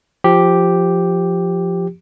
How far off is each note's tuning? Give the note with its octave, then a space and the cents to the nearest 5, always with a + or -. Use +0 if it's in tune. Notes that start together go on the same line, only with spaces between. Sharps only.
F3 +0 G4 +0